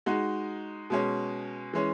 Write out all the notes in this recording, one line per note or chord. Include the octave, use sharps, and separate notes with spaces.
G#3 D#4 F#4
B2 G#3 C#4
E3 G#3 C#4